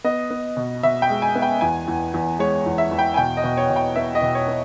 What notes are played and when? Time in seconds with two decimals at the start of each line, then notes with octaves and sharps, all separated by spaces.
0.04 B3 D#5
0.31 B3
0.57 B2
0.83 B2 E5
1.02 G5
1.10 G#3
1.22 G#5
1.35 B3
1.42 G5
1.61 E2 G#5
1.88 E2
2.14 E2
2.39 G#3 C#5
2.66 E2
2.78 E5
2.91 E2
2.99 G5
3.14 G#5
3.17 B2 G5
3.37 D#5
3.44 B2
3.57 C#5
3.70 B2
3.76 G5
3.96 B3 E5
4.15 D#5
4.22 B2
4.35 C#5
4.48 B3